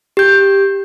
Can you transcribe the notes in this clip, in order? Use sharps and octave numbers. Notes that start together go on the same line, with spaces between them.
G4 G6